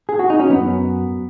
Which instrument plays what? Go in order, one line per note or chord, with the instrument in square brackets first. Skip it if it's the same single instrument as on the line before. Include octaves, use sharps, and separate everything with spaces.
[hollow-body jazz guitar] G#4
F#4
D#4
C#4
F#2 F#3 B3